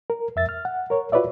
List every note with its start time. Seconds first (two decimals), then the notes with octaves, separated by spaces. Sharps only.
0.10 A#4
0.36 F2 E5 A6
0.49 F6
0.65 F#5
0.90 A#4 C#5
1.12 F4 F#4 B4 C#5 D5 E5